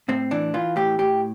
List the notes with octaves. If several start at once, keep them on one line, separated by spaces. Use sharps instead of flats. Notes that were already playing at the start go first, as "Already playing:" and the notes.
A2 C4
E3 D4
E3 F4
A2 G4
A2 G4